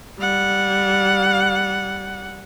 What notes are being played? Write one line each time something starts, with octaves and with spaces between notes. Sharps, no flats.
G3 F#5